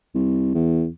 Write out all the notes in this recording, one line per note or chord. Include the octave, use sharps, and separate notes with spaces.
C2
E2